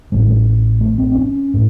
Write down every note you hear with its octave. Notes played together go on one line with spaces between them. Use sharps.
A1 A2 G#3
G3
G#3
A3
C4
C#4
A2